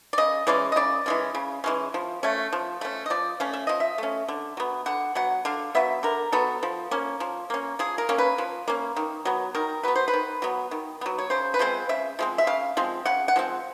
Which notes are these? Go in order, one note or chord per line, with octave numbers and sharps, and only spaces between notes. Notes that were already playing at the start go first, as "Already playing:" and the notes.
D5
C#3 D#5
E3 G#3 C#4 D5
D#5
C#3 D5
E3 G#3 C#4
C#3
E3 G#3 C#4
F3
A3 C#4
F3
A3 C#4
D#5
F3 D5
A3 C#4 F5
E5
F3 D#5
E5
A3 C#4
D3
F#3 B3
D3 F#5
F#3 B3 F#5
D3 F5
F#3 B3 E5
D3 A#4
F#3 B3 A4
F3
A#3 C#4
F3
A#3 C#4
F3 G#4
A#4
A#3 C#4
B4
F3
A#3 C#4
D#3
F#3 B3
D#3 A#4
F#3 B3 B4
C5
B4
D#3
F#3 B3
D#3
F#3 B3
C#5
C#3 C5
B4
F3 G#3 C4 C5
C#3 E5
F3 G#3 C4
E5
C#3 F5
F3 G#3 C4
C#3 F#5
F#5
F3 G#3 C4